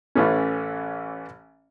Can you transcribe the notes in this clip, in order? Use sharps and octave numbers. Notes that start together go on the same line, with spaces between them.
A1 E3 A3 C#4